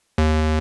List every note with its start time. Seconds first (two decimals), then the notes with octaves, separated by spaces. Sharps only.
0.18 D#2